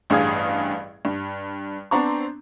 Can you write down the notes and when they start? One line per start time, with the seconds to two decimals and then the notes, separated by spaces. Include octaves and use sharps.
0.10 A1 G2 G#4 F5 D#6 G#6
1.05 G2
1.91 B3 C4 D4 A#5 C#6